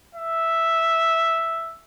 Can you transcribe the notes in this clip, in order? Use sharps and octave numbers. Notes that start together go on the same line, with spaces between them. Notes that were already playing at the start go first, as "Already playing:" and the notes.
E5